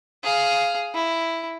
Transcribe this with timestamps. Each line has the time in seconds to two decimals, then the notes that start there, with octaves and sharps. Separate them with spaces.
0.24 G#4 F5
0.94 E4